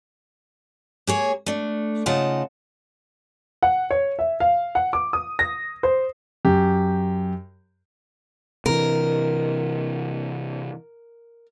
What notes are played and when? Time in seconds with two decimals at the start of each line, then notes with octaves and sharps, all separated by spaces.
1.07 A#3 G#4 C#5
1.46 A3 D4
2.06 C#3 D#4 F4 F#5 A5
3.63 F#5
3.91 C#5
4.19 E5
4.40 F5
4.75 F#5
4.93 D6
5.13 D#6
5.39 A#6
5.83 C5
6.45 F#2 G4
8.66 C3 E3 A#4